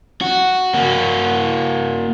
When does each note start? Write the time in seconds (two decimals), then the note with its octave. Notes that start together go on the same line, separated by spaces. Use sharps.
0.21 F#4
0.74 A#3 F#4